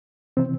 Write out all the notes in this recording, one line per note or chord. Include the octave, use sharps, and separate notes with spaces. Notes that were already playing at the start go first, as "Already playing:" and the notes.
C3 E3 C4